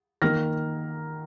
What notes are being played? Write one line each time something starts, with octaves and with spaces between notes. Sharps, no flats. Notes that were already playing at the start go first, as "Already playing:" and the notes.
D#3 A#3 F6 A#6